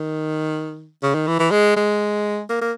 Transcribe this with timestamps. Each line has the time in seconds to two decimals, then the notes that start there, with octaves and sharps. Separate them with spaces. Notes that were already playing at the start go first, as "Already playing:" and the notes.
Already playing: D#3
1.03 C#3
1.14 D#3
1.27 E3
1.39 E3
1.51 G#3
1.76 G#3
2.49 A#3
2.61 A#3